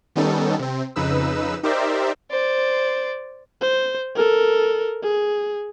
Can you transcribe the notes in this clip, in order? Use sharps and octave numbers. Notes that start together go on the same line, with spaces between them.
D#3 G3 B3 C#4 D#4 A4
C3 C4
F2 C#3 D#4 B4 E6
D#4 G4 A#4 C5 D5 E5
C5 D5
C5
A4 A#4
G#4